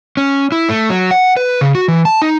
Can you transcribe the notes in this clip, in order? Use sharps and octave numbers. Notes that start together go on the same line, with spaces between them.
C#4
E4
A3
F#3
F#5
B4
C#3
F#4
E3
A5
D#4